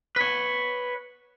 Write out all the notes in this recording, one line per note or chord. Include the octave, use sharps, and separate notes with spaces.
B4 C#5